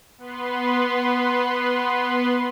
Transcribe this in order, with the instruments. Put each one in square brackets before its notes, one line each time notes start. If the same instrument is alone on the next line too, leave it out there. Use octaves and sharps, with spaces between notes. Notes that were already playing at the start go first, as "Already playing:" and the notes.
[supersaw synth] B3 B4 C6